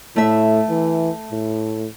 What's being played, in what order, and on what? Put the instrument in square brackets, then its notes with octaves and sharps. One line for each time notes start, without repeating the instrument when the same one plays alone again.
[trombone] A2 [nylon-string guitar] A3 E5
[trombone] E3
A2